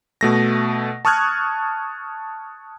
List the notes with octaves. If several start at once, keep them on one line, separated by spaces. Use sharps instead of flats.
B2 A3 A#6
A5 C#6 D#6 F6 F#6 G#6